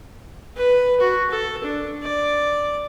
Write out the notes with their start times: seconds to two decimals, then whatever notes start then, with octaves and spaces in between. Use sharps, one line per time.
0.57 B4
1.01 F#4
1.30 A4
1.64 D4
2.03 D5